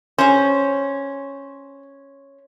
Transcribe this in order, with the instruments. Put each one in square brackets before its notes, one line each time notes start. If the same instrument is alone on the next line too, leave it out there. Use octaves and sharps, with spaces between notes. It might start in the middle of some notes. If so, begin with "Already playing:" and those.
[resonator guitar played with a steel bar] C#4 [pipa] G#4 C5